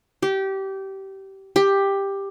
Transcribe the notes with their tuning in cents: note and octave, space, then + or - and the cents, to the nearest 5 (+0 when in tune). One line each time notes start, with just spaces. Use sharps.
G4 -20
G4 +10